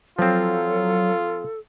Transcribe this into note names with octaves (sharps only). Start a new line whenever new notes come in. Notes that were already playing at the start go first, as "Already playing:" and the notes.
F3 F#3 C4 F4 A4